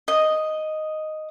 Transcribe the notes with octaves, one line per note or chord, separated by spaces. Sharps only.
D#5